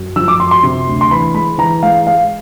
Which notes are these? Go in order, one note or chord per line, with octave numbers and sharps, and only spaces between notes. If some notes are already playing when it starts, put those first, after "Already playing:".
Already playing: F#2
F3 E6
D6
F#2 C6
C6
C3
D2
C6
E3 B5
G#3 B5
E3 A#5
G#3 F5
G#3 F5